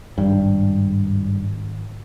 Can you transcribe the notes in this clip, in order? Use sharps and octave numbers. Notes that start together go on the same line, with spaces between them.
G#1 G2